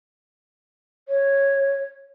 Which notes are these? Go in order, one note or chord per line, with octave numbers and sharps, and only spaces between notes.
C#5